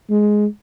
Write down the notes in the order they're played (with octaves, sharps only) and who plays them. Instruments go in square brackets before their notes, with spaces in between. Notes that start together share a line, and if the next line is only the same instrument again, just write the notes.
[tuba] G#3